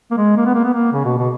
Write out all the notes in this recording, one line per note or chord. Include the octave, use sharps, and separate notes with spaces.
A#3
G#3
A#3
B3
A#3
B3
A#3
C#3
B2
B2